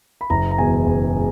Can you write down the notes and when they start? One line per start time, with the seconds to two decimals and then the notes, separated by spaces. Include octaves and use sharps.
0.21 B5
0.30 F#1 A#5
0.51 A#5
0.58 E2 B2 G#3 G#5
0.87 F#1
1.16 B2 G#3